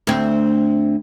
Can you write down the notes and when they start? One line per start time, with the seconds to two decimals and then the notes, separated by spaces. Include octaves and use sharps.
0.07 D2 C4